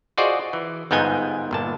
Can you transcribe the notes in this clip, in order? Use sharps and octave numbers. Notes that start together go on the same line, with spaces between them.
F4 F#4 G#4 C5 D5 D#5
E3
G1 G#2 B3 D#4 G5 G#5
G1 A#2 A5